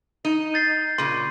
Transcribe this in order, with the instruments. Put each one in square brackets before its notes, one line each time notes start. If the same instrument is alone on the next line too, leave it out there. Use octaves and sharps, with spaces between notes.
[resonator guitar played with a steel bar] D#4
[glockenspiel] G6 A6 C7
[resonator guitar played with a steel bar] A#2 C#3 [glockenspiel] C6